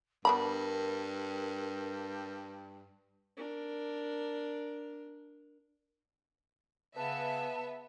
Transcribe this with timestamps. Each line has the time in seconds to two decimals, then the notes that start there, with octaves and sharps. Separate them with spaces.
0.25 G2 B3 D4 A#4 B5
3.37 D4 A#4
6.96 C#3 B3 B4 E5 A5